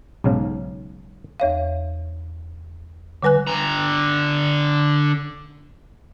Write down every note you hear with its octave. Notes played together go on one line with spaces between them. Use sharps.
B1 G#2 C#3 F5
E2 C#5 F5
D3 G3 B4 G#5 F#6
D3 A#5